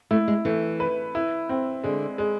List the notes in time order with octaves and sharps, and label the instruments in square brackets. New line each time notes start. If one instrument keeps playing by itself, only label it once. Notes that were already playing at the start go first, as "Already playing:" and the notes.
[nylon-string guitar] A3 [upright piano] E4
[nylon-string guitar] G#3
[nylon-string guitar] E3 [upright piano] A3
[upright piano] B4
E4
C4
[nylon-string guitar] D3 [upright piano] G#3
[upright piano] G#3